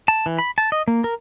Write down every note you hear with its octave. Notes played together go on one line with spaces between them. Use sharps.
A5
E3
B5
A5
D#5
A#3
A#4